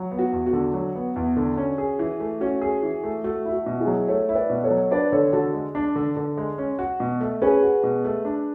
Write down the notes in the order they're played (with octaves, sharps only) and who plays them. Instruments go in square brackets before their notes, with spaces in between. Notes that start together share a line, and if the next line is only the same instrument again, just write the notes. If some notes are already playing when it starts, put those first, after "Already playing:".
Already playing: [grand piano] F#3
B3
[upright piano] F#4
[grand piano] E2
[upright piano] F#4
[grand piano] D3
F#3
B3
E2
D3
C#4
G#4
E3
A3
[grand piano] C#4 [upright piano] F#4
[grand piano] G#4
E3
A3
[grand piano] A3 [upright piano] F#4
[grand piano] E4
[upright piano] F#4
[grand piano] B2
[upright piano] E4 G#4
[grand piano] F#3
[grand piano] A3 [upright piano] A4 C#5
[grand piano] E4
[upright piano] B4 D5
[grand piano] B2
[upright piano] A4 C#5
[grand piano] F#3
[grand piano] D4 [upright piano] B4 D5
[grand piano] D3 [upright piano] A4 C#5
[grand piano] D3 [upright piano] F#4 A4
[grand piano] G#3
D4
D3
D3
G#3
C#4
F#4
B2
A3
[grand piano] C#4 [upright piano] G#4 B4
[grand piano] F#4
B2
A3
D4